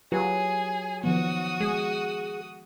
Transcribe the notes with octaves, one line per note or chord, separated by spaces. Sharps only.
F#3 F4 G4 G#4 B4
D#3 F3 B3 F#4 D#6
G#3 G#4